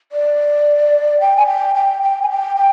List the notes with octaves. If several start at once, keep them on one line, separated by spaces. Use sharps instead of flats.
D5
G5
G#5
G5
G5
G5
G#5
G5
G5